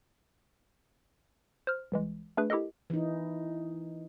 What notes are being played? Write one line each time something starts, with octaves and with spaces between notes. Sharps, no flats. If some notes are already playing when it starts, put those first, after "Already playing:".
C5 F6
C2 E3 G#3
A3 D4 G#4 B4
E4 G4 A4 A#4 D#5
E3 D#4